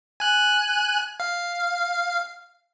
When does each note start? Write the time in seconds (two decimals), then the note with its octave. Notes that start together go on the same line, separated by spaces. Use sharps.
0.20 G#5 F#6
1.20 F5